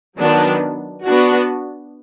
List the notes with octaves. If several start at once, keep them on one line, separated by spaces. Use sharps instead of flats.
D#3 F#3 B3 D4
B3 D4 F#4